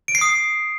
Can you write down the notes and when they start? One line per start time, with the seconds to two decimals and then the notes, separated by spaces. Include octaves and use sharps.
0.08 D7
0.15 C7
0.21 D#6